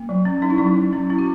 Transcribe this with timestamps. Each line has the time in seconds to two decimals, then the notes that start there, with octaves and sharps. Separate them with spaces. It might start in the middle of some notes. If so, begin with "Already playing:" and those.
Already playing: A#3
0.09 F#3
0.25 C#4
0.42 C#4 D#4
0.50 E4
0.58 F#3 D#4
0.76 F#3
0.93 C#4
1.10 C#4 E4
1.19 F#4